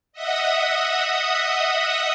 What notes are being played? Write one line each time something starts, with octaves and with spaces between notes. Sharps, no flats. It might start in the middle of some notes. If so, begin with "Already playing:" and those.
D#5 E5 F#5 D#6